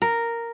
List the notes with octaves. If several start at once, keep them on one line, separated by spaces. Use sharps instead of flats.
A#4